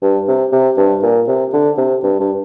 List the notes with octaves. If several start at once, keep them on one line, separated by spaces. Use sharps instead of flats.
G2
C3
C3
G2
A#2
C3
D3
C3
G2
G2